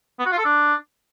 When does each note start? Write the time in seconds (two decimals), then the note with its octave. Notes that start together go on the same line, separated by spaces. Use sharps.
0.19 B3
0.26 F#4
0.32 F4
0.38 A4
0.45 D4